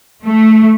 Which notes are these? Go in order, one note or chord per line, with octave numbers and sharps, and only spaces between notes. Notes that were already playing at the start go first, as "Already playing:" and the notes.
A3